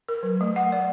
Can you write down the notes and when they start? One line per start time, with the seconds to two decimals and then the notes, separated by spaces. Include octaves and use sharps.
0.08 A#4
0.23 F#3
0.41 A3
0.56 F#5
0.72 D5